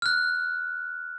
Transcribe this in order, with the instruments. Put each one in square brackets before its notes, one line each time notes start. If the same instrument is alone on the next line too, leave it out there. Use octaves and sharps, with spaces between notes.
[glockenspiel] F6 F#6